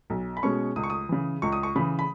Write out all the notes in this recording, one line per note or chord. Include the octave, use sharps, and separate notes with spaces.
B1
B5
B2 G#3 C#4 C#6
C#2 D#6
C#6
D#6
C#3 E3
C#2 C#6
D#6
C#6
C#3 E3 B5
B5